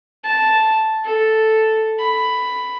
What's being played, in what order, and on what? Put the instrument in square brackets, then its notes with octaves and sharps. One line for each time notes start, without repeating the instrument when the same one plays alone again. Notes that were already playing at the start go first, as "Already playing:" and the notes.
[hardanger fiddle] A5
A4
B5